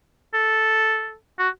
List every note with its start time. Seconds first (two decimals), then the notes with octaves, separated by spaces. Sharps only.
0.34 A4
1.39 F#4